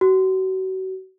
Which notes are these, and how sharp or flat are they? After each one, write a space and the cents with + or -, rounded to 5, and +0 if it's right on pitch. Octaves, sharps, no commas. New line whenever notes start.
F#4 +35